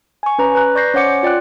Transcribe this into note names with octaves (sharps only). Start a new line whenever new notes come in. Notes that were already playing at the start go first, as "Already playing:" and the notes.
G#5 C#6
C#4 B4 A#5
B4 A#5 F#6
D5 C#6 G6 A#6 C7
C#4 C5 C#5 F#5 D6 C#7
F4 D5 G5 F#6